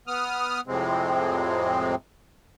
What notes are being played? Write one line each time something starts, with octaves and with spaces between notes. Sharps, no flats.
B3 D#6 F6
F2 A2 C3 G#3 C4